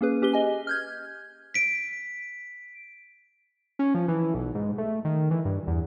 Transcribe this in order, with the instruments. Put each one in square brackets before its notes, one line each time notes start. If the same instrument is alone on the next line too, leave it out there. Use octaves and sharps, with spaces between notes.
[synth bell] A#3 C#4 G#4 B4
C#4 G4 B4 G7
D#5 G#5
F6 G6 G#6
[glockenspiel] B6 D7
[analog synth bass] C#4
F3
E3
B1
G#2
A3
D#3
E3
G2
E2